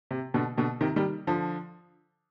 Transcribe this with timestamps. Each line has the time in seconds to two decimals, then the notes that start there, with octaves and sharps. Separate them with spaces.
0.11 C3
0.34 B2 D3
0.57 B2 D3
0.81 C3 D#3
0.96 D#3 G3
1.27 D3 F3